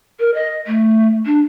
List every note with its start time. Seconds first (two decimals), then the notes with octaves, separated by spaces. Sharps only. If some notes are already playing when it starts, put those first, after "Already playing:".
0.20 A#4
0.34 D#5
0.67 A3
1.26 D4